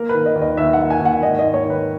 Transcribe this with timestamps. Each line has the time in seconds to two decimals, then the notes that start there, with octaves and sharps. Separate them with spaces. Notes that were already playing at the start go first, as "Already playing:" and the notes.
Already playing: A#3 A#4
0.09 D#3 B4
0.26 D#5
0.35 D#2
0.41 D#5
0.57 D#2 E5
0.73 F#5
0.79 A#3
0.90 G#5
1.01 D#2 F#5
1.23 G#2 D#5
1.39 D#5
1.44 G#2
1.54 C#5
1.65 D#3 B4